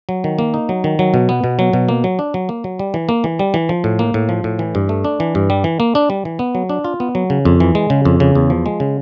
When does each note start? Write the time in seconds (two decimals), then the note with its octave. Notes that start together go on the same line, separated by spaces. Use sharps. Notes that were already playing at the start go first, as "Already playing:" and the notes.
0.09 F#3
0.24 D#3
0.39 A#3
0.54 D#4
0.69 F#3
0.84 D#3
0.99 F#3
1.14 B2
1.29 B3
1.44 B2
1.59 F#3
1.73 B2
1.89 A#3
2.04 F#3
2.19 D4
2.34 F#3
2.49 A#3
2.64 F#3
2.79 G3
2.94 E3
3.09 A#3
3.24 E3
3.39 G3
3.54 E3
3.69 F3
3.84 A2
3.99 A#3
4.14 A2
4.29 F3
4.44 A2
4.59 E3
4.75 G2
4.89 A3
5.04 D4
5.20 E3
5.35 G2
5.50 G3
5.64 E3
5.80 A#3
5.95 D4
6.10 G3
6.25 E3
6.39 B3
6.55 F#3
6.69 D4
6.84 F4
7.00 B3
7.15 F#3
7.30 C#3
7.45 F2
7.60 E3
7.75 G#3
7.90 C#3
8.05 F2
8.20 C#3
8.35 E2
8.50 F3
8.66 G#3
8.80 C#3